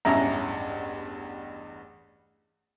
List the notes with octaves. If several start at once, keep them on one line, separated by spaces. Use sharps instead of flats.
A1 E2 G2 C#4 E5 A#5